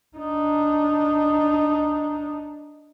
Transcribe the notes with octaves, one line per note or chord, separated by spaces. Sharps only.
D4 D#4